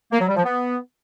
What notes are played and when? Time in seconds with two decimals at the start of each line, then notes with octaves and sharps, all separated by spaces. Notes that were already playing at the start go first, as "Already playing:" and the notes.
0.12 A#3
0.20 F#3
0.28 G3
0.36 F3
0.45 B3